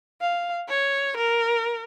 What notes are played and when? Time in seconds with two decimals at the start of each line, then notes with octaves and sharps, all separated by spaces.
0.21 F5
0.69 C#5
1.17 A#4